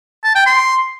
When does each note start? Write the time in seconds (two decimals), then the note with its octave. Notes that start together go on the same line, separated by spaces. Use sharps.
0.24 A5
0.35 G5
0.46 C6